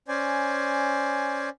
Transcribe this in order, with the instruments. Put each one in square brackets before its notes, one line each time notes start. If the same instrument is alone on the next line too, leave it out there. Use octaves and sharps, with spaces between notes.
[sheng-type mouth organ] C#4 C5 D5 G#5